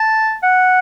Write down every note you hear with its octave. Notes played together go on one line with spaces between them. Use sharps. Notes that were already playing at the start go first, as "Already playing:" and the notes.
Already playing: A5
F#5